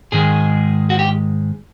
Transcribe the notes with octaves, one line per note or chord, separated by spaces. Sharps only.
G#2 D#3 G#3 G#4
F#4
G4